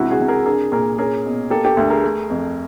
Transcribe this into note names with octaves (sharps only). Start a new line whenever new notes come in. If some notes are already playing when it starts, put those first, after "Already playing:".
Already playing: C#2 C3 E4 F#4
F#4 G#4
C3
G#4 A#4
D4 G#4 A#4
A#2 G#4 A#4
C#4 G#4 A#4
B2
A#3 G4 A4
G4 A4
D2
G#4 A#4
A3
F2